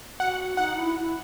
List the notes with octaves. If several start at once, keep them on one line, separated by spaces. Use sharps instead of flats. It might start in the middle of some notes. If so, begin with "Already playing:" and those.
F#4 F#5
D#4 F#5
E4
E4